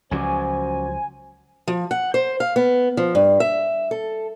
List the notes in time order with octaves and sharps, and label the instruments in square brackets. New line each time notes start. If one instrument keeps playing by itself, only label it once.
[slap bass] C#2 F3 F#3 [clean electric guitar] C#4 F#4 D5 [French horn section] C5 [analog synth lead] G#5
[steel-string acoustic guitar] F3
F#5
C5
F5
B3
F3
G2
E5
A4